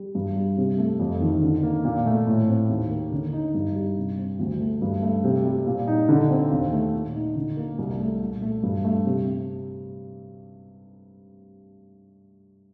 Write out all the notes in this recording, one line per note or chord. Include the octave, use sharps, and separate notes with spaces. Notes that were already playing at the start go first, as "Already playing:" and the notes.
Already playing: G3
G2
G3
C3
A3
F2
D#3
D3
A#3
A#2
A3
A2
C4
D#2
A#3
D3
D#4
G2
G3
C3
C4
D2
A3
G2
A3
C3
G3
A#2
D#4
D3
C4
D#2
A3
A#2
D#4
D3
A#3
C2
A3
A#2
A3
G2
A3
C3